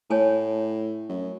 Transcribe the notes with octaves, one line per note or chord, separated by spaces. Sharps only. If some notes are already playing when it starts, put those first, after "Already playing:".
A2 C#5 G#5 A5
F#2